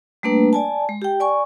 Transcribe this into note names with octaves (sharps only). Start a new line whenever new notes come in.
G3 A3 A#3 D4 B4
D5 G#5 A5
G#3
G4 G5
D5 G#5 C#6